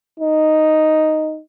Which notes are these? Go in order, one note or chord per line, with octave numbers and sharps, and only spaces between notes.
D#4